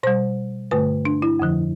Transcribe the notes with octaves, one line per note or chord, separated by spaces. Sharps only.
B2 G3 C5
G2 D3 A3 B4
D4
E4
F2 D3 F3